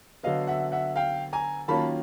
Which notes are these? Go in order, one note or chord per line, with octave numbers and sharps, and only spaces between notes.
D3 F#3 B3 D#5 F5
E5 F#5
E5 F#5
F5 G5
G#5 A#5
D#3 F#3 A#3 C#4 F4 A5 B5